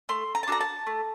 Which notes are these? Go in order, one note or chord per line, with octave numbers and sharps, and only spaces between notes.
A3 C6
A#5
A5
D4 F#4 A4 A#5
A5
A3